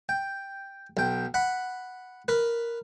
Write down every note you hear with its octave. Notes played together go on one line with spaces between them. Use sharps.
G5
B1 G5
F#5 B5
A#4 B4